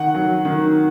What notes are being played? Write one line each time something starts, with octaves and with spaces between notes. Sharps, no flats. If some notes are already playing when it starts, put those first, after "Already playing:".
Already playing: D#3 F#5
F#3
D#3